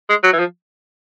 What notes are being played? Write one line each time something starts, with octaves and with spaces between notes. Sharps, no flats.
G#3
F#3
E3
F3